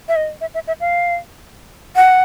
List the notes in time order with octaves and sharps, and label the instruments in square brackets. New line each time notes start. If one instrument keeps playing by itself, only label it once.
[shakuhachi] E5
D#5
E5
E5
E5
F5
F#5